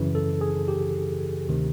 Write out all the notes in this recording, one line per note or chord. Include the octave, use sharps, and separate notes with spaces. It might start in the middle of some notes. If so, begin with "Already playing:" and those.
Already playing: F#2 C#3 E3
A4
G#4
G4
D2 C3 D#3